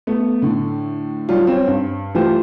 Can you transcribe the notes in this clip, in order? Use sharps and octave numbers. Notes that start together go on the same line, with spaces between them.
A3 B3
A2 D3
F#3 G3 D4 F4
C4 C#5
G2
E3 A3 F4 G4 C5